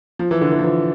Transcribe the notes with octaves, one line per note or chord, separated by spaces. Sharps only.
F3
E3
D3
E3
F3
E3